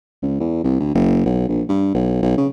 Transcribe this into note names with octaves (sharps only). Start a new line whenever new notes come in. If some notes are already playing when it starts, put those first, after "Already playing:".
C#2
E2
C2
D2
F#1
B1
A#1
G2
B1
B1
C#3